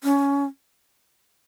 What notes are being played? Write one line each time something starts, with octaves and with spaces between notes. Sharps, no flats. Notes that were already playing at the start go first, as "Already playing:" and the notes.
C#4